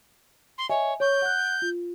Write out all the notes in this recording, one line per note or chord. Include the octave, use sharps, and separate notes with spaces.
C6
C#5 D#5 E5 G#5
C#5 C#6 G6
F#5 F#6
F4